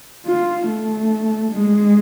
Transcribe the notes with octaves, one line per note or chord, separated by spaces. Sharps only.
F4
A3
G#3